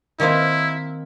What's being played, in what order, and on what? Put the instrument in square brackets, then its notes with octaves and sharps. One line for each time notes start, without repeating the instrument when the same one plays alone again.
[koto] D#3 A#3 C4 [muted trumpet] E4